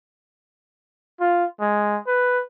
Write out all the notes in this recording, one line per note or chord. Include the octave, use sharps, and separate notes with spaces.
F4
G#3
B4